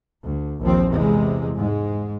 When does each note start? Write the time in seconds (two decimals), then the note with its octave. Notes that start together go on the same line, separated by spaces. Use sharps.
0.23 D2
0.61 A#1 D#2 F3 C4
0.90 E2 C3 G#3
1.57 G#2 G#3